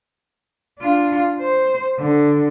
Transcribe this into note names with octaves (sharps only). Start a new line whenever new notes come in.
D4 F4
C5
D3